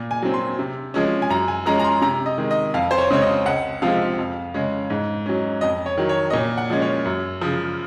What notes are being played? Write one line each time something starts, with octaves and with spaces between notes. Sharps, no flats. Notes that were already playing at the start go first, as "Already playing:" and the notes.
Already playing: A#2
G#5
F#3 C4
C6
C3
F3 G#3 C#4
G#5
F#2 A#5
G#5
F3 G#3 C#4 A#5
A#5
C6
C3 A#5
D#5
D#3 G#3
D#5
F2 F5
C5
C#5
C#3 G#3 C4 C#5
D#5
C#2 F#5
C3 F3 G#3 C4 F5
F2
C#3 G#3 C#4
G#2
F#3 C#4
F2 D#5
C#5
D#3 F#3
C#5
D#5
A#2 C#5
F#5
F3 G#3 C#4
C#5
F#2
C#3 F3